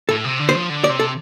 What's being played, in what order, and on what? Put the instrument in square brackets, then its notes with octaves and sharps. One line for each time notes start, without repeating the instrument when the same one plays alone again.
[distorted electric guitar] A2 [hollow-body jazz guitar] A4
[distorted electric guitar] C3
D3
[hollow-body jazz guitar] C5
[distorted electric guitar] F3
D3
[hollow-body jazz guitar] D5
[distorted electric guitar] C3
[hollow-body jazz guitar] A4